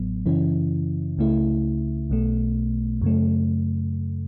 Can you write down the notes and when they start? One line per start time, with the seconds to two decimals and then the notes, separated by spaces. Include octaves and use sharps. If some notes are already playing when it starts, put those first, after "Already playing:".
Already playing: A1 A2 F#3 B3
0.26 F#2 C#3 E3 C#4 E4
1.18 C#2 C#3 A3 E4
2.10 B1 B2 A3
3.01 F#2 C#3 A3